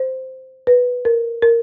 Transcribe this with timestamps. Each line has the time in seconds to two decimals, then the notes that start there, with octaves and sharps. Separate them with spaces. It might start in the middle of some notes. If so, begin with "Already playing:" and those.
Already playing: C5
0.67 B4
1.05 A#4
1.42 A#4